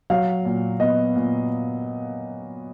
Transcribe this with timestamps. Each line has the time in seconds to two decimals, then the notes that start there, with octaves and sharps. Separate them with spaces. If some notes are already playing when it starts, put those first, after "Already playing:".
0.10 F#3 F5
0.45 A#2
0.80 B3 D#5
1.15 A#2